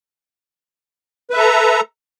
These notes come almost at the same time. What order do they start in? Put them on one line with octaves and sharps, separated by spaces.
B4 E5 A4 A#5